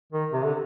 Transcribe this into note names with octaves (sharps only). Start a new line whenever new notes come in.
D#3
C3
D3